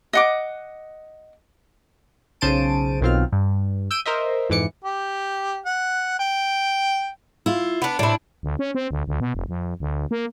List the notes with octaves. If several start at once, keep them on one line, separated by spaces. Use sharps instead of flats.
D#5 F#5 D6
B1 C#3 C5 A5 D7 D#7
B1 B2 D#3 C4 F4 F6
G2
E6 G6 D7 D#7
A#4 C5 D#5 E5
F2 G#2 E3 D6 C#7
G4
F#5
G5
E4 F4
B3 D4
A2 C3 D4 E4
D2
C#4
C4
D2
D2
B2
F1
F2
D2
A#3